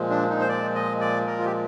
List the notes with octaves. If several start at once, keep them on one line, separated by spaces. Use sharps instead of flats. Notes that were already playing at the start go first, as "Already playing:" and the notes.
Already playing: A#2 F3 G#3
D4
D#4
C5
D5
D#5
D5
A#4
F4
G4